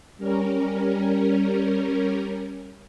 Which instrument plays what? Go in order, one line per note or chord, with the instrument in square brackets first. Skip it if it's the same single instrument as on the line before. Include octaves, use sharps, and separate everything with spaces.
[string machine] G3 C#4 A#4